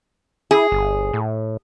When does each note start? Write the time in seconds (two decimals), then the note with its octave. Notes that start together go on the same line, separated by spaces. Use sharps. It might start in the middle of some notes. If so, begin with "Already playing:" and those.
0.51 E4 G#4
0.72 G1
1.13 A2